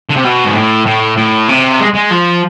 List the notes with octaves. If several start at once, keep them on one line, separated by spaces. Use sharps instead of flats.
D3
C3
B2
G#2
A2
A2
A2
C3
G#3
G#3
F3